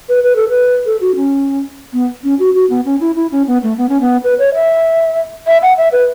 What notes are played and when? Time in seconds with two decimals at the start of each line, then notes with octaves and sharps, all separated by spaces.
0.09 B4
0.24 B4
0.36 A4
0.49 B4
0.86 A4
1.01 F#4
1.16 C#4
1.93 B3
2.24 C#4
2.39 F#4
2.55 F#4
2.70 B3
2.85 C#4
3.01 E4
3.16 E4
3.32 C#4
3.47 B3
3.63 A3
3.78 B3
3.89 C#4
4.01 B3
4.24 B4
4.39 C#5
4.55 E5
5.47 E5
5.63 F#5
5.78 E5
5.92 B4